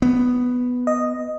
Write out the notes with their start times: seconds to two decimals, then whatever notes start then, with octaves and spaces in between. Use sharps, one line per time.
0.02 B3
0.87 D#5